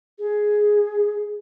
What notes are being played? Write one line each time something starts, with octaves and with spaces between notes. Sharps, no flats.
G#4